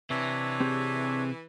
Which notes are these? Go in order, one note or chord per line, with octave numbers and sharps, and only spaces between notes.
C3 E3 D4 C#5 E5
C4 G4 G#4